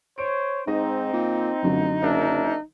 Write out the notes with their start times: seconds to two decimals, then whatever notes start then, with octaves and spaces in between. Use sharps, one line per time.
0.18 C5 C#5 D7
0.67 G#2 C4 D#4 D#5
1.13 A#2
1.63 F1 F#2 D3 F#3
2.02 F#1 D4 A#4 E5